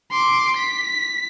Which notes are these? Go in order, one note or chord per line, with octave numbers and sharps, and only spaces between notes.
C6 D6
B6